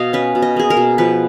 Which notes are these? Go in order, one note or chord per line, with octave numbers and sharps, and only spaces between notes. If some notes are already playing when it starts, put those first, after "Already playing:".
Already playing: B2 D#5 F5
C#4 B4
B2
D#5
A#3 G#4
A#4
B2
F3 B4